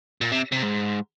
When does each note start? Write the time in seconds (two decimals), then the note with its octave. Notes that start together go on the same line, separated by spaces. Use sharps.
0.21 A#2
0.32 C3
0.52 C3
0.62 G#2